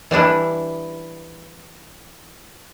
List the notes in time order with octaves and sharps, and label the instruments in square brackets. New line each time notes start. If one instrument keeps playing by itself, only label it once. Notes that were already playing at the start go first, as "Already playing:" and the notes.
[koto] E3 G3 D4 E4